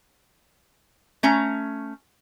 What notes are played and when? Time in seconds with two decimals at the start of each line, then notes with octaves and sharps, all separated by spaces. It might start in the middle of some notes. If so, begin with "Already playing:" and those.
1.23 A3 C#4 A#5